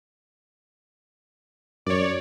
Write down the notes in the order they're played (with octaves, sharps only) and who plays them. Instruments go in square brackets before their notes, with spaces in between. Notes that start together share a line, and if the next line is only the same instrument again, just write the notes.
[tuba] F#2 [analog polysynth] C#5 D5